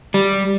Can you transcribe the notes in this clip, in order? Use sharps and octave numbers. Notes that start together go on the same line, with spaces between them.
G3